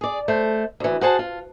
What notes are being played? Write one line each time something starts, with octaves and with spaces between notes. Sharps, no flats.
G#4 D5
A3 C5
D2 E3
F#4 G#4 C5 F#5 G#5 A5
F4